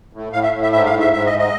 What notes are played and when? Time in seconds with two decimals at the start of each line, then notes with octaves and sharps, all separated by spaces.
0.13 A2
0.32 A2 F5
0.43 E5
0.52 A2
0.62 E5
0.72 G#2 E5
0.86 F5
0.92 G#2
1.00 E5
1.13 G#2 E5
1.26 D#5
1.32 G#2
1.39 D#5